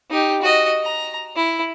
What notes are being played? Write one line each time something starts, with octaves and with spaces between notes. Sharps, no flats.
D#4 G4
F#4 D#5
A#5
E4